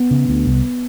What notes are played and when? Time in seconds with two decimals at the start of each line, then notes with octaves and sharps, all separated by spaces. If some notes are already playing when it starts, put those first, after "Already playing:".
Already playing: B3
0.11 C#3
0.28 D2
0.46 C2